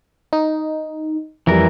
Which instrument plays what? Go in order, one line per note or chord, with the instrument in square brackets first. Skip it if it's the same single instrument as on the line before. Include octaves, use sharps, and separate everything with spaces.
[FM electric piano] D#4
[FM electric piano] F2 G3 [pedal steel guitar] E3 A#4